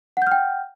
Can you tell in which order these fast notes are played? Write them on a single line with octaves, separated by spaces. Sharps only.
F#5 G6 F6 G5